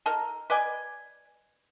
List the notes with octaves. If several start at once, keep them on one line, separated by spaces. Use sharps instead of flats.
D#4 A4 A#4
B4 D5 D#5 G#5